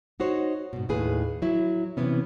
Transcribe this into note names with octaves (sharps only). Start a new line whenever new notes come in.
D#4 F#4 C5 C#5
G#2 B2
D#2 A2 G#4 B4
F#3 E4
C3 E3 B3 C#4